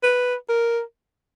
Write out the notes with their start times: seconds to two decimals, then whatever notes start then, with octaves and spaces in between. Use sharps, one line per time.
0.03 B4
0.49 A#4